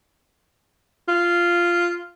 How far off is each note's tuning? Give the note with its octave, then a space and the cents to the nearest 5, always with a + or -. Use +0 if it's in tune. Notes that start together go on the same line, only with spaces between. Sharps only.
F4 -10